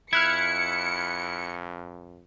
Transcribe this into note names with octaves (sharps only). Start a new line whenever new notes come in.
F2 E4 F6 F#6 G#6 C#7